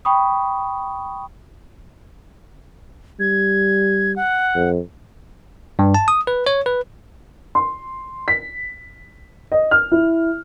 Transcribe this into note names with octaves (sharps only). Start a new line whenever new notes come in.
G5 B5 C#6 D#6
G3 G#6
F#5
F2
G2
A5
D#6
B4
C#5
B4
C6
B6
D#5
F6
E4